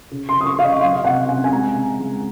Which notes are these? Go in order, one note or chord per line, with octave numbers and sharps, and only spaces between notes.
C#3
C6
C#3
D#6
C#6
C#3 F5
D#5
F#3 F5
F5
C3 F#5
C3 G#5
G#5
G#3 A#5
C#3
G#3